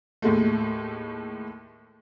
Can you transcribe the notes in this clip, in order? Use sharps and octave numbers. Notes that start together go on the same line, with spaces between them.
D#2 A2 G#3 A3